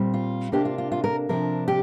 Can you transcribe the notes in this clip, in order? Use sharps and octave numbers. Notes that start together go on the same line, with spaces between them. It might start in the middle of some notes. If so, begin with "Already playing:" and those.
Already playing: A#2 G3 C4
F4
C3 A#3 D4 G4
F4
F4
F4
A#4
C3 F3 D4 A#4
G4